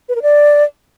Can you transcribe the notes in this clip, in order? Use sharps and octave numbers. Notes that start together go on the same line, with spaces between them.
B4
A#4
D5